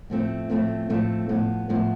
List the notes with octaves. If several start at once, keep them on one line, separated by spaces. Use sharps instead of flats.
A2 F3 A3 C4
A2 F3 A3 C4
A2 F3 A3 C4
A2 F3 B3
A2 F3 B3